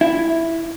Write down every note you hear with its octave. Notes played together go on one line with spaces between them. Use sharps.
E4